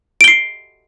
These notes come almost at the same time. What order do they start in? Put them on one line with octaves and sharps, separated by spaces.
D7 G7 C7